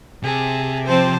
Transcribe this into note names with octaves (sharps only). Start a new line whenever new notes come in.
C3 G#4 A5
F3 C4 C5 A5